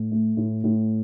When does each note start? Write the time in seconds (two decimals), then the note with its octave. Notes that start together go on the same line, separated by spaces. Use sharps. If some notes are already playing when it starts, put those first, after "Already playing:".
Already playing: A2
0.11 A3
0.37 A2
0.64 A2